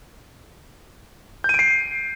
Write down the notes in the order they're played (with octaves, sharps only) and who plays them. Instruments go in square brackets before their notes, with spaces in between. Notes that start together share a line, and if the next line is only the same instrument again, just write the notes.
[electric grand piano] G6
D#7
D7
C7